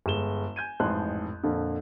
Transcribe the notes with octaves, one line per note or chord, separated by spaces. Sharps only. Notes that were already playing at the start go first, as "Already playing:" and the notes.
G1 G#3 E7 G7
G#5 G6 G#6 D#7
A1 F2 G#2 A5 C6 F#6
F2 A#2 D3